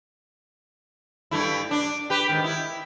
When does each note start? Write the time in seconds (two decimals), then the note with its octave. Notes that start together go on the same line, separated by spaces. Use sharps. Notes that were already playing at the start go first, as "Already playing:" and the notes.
1.31 G2 A3 E4
1.71 D4
2.10 G4 B4
2.29 G#2 D#3
2.44 E4